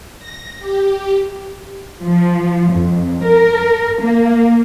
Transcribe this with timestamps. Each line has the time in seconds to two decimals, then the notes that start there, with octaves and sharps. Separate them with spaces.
0.19 A#6
0.59 G4
2.01 F3
2.71 F2
3.23 A#4
4.00 A#3